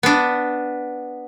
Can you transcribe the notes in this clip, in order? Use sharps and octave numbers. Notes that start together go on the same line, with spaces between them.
B3 D4